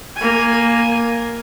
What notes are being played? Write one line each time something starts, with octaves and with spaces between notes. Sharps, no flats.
A#3 G#5